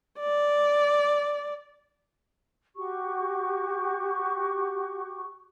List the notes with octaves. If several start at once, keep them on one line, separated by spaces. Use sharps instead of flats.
D5
F#4 G4 C#6